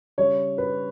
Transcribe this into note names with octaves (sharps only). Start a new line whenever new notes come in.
C#3 G3 C#5
B4